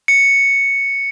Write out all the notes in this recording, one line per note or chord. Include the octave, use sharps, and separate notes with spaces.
C#7